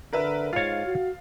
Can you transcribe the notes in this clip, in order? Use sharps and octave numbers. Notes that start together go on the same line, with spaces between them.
D3 A#4 B4 E5
G#2 F4 C#5 F5 A6
F#4